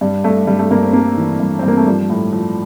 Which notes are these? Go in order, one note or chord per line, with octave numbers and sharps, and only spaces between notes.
G2 G3
G2 A3
G2 G3
A3
G2 A#3
C4
G3 A#3
E3
G2
G2 C4
A#3
A3
F3 G3
A2
F3